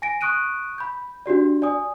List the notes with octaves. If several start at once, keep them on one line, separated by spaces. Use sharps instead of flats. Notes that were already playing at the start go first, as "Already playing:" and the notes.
G#5 A#6 D7
C#6 D#6 F#6 D7 D#7
B5 G6
D4 F#4 G4 D5
D5 G#5 D#6